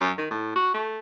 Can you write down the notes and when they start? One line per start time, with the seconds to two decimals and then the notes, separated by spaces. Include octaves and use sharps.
0.01 F#2
0.18 D#3
0.31 A2
0.56 F#4
0.74 A3